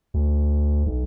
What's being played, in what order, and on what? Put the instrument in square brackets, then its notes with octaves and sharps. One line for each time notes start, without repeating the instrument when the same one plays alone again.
[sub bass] D2
B1